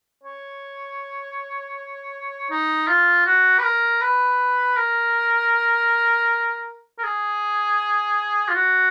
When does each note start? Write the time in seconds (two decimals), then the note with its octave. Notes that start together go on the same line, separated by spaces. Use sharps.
0.23 C#5
2.50 D#4
2.88 F4
3.26 F#4
3.59 B4
3.63 A#4
4.01 B4
4.76 A#4
6.98 A#4
7.03 G#4
8.48 F4
8.54 F#4